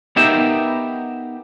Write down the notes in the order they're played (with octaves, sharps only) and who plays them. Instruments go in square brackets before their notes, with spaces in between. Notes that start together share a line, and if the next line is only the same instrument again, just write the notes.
[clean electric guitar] B3 D#4 G4 A#4 E5